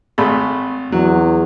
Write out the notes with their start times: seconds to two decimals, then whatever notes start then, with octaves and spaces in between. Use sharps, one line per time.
0.18 G#1 A3 B5
0.92 E2 F#3